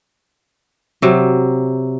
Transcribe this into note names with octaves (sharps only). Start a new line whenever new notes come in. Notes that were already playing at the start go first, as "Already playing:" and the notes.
C3 F#3